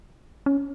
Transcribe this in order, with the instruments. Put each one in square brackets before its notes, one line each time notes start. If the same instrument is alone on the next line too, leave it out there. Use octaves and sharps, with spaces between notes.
[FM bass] C#4